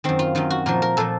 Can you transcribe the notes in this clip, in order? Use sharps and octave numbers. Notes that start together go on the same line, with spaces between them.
F#2 D#3 C4
F4
F#2 D#3 F4
F#4
A#2 F3 A#4
A#4
A#2 F3 A4